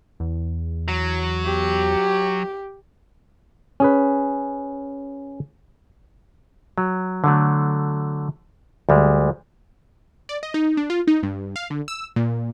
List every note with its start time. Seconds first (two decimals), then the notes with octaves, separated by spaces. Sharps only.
0.20 E2
0.88 F#3
1.46 G4
3.80 C#4 G#4 B4
6.78 F#3
7.24 D3 F#3 A3
8.89 D2 G3 G#3
10.29 D5
10.43 D#5
10.54 D#4
10.77 D4
10.90 F4
11.07 D#4
11.23 G2
11.56 F5
11.70 D3
11.88 E6
12.16 A#2